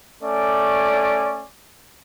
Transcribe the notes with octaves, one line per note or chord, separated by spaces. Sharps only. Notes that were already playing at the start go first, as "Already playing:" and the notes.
A3 C#4 D5